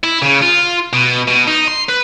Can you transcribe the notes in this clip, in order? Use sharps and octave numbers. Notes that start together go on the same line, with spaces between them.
E4
C#3
F4
B2
B2
D#4
C6
B4